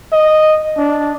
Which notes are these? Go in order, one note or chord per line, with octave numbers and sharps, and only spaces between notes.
D#5
D4